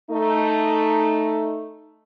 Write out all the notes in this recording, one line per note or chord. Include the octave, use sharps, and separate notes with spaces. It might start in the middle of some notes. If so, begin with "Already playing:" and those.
A3 D#4